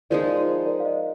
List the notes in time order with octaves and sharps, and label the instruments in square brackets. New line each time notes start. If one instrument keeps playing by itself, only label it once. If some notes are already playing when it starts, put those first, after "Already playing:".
[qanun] F3 G#3 D#4 [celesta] A#4 D5
[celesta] C5
A#4 D5
F5
C5 D#5